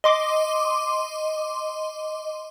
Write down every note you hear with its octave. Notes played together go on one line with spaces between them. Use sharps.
D#5 C6 D6